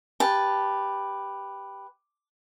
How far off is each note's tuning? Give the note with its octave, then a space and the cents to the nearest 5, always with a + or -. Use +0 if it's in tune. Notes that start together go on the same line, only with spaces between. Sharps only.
G4 +5 B4 +0 A5 +0